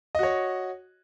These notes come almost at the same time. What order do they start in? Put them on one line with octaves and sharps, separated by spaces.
D#5 F#4 C#5